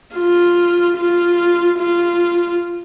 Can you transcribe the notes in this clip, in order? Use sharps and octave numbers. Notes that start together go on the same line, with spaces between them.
F4
F4
F4